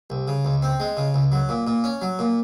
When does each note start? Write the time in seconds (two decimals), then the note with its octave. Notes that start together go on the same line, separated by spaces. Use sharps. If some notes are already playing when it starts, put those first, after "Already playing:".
0.10 C2
0.28 C#3
0.45 C#2
0.62 C4
0.80 G#3
0.97 C#3
1.14 C#2
1.32 F#3
1.49 A#2
1.67 A#2
1.84 C#4
2.02 F#3
2.19 A#2